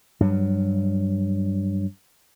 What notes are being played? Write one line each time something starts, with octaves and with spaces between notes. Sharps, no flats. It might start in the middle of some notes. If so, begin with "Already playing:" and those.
G2 F#3